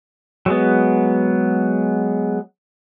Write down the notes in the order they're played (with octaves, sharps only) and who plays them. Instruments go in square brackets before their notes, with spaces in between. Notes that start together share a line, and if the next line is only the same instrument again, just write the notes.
[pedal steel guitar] F#3 G#3 B3